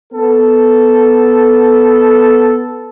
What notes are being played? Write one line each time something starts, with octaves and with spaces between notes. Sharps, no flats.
B3 A4